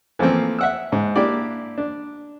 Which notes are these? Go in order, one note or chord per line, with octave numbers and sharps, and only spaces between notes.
E3 F3 A3 A#3 C4
E5 F#5 E6
G#2
A#3 D4 E4 G4 D5
D4